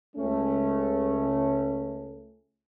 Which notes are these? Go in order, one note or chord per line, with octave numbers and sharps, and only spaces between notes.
C#2 A3 C#4